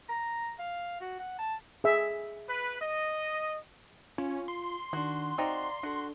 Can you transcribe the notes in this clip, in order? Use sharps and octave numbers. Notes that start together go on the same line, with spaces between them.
A#5
F5
F#4
F#5
A5
G#4 E5
B4
D#5
C#4 F4
C6
D#3 D4 F#4
C4 D#4 F#4 D5 F5 A#5
D4 F#4 A4